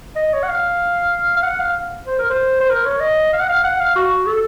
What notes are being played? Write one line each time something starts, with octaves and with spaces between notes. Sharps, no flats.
D#5
C#5
F#5
F5
F5
F#5
F5
C5
A#4
C5
C5
A#4
C#5
D#5
F5
F#5
F5
F#5
F5
F#4
A4